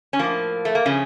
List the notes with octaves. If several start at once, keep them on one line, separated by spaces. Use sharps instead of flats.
C#4
A2 F3 A#3
A3
A#3
C#3 F3 C#4